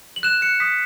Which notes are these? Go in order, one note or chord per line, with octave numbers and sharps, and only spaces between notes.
F#7
F#6 E7
F#6 C#7
D#6 B6